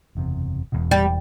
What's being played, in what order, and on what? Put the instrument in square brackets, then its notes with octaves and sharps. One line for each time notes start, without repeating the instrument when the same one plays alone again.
[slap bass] F#1 E2 C3
E1 E2 B2
[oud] G3